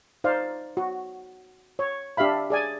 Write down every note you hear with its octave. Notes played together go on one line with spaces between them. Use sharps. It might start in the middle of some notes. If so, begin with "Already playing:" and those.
D#4 C5 D5 F5
F#4
C#5
D4 G4 E5 F5 B5
G#4 D5 G#5